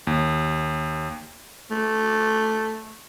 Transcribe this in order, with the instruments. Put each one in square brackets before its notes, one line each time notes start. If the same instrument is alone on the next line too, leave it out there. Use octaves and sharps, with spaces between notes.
[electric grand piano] D#2
[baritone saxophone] A3